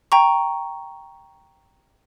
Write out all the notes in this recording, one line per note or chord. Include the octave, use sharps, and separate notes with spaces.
G5 A#5 C#6